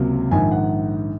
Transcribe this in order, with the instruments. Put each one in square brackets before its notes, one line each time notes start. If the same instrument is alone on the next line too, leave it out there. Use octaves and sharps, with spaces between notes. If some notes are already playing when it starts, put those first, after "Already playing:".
Already playing: [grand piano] C#2 C3 F#3 A#3
A#1 G#2 D#3 G#5
F#5